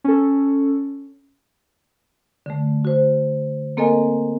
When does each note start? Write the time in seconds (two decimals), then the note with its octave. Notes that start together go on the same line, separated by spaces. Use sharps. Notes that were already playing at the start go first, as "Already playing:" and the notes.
0.04 C#4 A4
2.46 D3 A3
2.85 F#4 C5
3.77 A#3 C4 A4 A#4 D#5 G#5